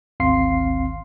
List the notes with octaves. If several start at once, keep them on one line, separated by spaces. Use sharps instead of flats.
G#1 D2 C4 F5 C6 C7